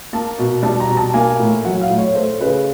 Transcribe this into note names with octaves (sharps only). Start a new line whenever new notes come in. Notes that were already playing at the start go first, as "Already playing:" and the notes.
A#3 A5
B2
G3 A5
A#5
B2
A5
A#3 G#5
A2
F#3 F#5
F5
A2
C#5
A3 C5
C#3 B4